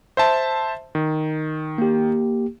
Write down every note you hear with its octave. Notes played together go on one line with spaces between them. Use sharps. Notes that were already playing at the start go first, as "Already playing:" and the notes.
C5 E5 A5
D#3
A#3 G4